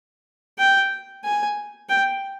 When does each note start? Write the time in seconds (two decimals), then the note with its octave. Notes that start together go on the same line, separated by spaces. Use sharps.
0.59 G5
1.25 G#5
1.89 G5